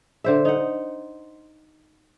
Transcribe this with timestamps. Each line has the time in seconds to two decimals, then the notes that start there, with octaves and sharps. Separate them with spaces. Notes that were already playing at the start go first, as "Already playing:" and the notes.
0.24 D3 C5 E5
0.45 D#4 F#5